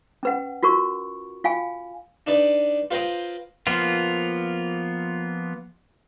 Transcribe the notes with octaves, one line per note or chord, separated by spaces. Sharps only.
C#4 B4 F#5
F4 F#4 A#4 C#6
F4 F5 G5 G#5
D4 D#4 B4 D5
F4 B4 C5 G5 A#5 D#6
F3 A#3 B3 F4